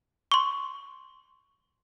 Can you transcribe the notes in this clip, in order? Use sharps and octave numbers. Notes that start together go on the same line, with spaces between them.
C6 C#6